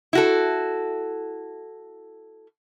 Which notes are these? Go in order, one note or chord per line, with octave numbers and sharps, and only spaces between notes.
E4 F#4 A4